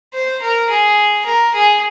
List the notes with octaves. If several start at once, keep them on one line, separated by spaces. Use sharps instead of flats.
C5
A#4
G#4
A#4
G#4